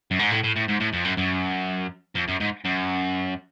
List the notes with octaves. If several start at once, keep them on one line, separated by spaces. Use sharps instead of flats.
F#2
G#2
A2
A2
A2
G#2
A2
F2
F#2
F#2
F2
F#2
G#2
F#2